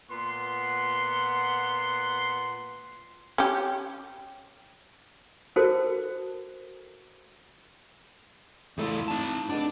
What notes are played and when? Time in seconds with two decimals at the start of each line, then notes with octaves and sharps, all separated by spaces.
0.10 A#2 B3 F#5 C6
3.38 C#4 G4
5.56 F#4 A4 A#4 C5 G5 A5
8.78 E2 A3 E4 F4 A4
9.08 D#4 A5
9.49 B3 D4 D#4 A4